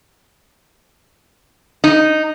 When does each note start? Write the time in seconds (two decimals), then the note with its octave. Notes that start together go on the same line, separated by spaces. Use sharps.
1.84 D#4